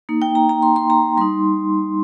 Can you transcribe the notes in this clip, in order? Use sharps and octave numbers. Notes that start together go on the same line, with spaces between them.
A#3 D#4
G5
A#5
A#5
C6
C6
A#5
G3 D#4 C6